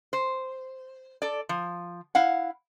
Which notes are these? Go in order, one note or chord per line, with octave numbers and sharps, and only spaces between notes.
C5
A4 D5
F3
E4 F5 F#5